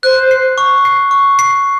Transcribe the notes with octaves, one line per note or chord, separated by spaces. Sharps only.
C5 F#6
C7
C#6
C7
C#6
C7